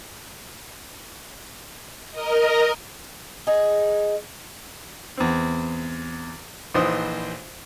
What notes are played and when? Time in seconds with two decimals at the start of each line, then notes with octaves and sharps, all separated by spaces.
2.11 A#4 D#5
3.47 D#4 G#4
5.18 E2 C4
6.74 A#1 E3 D#4 C5 D#6